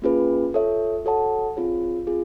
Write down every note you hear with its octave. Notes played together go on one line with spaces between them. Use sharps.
A#3 C#4 F4 G#4 B4
F4 A4 C#5 E5
F#4 A4 C#5 F#5 A5
C4 F4 G#4 C#5
C4 F4 G#4